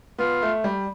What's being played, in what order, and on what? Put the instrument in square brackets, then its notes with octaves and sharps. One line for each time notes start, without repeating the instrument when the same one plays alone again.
[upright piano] B3 [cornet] F4
[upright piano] A3
G3